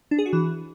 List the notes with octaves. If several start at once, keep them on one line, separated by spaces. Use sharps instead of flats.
D4
G#4
F#4
E3